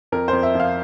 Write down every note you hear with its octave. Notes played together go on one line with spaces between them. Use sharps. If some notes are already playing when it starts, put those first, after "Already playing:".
F2 A#4
F2 C5
E5
F3
F5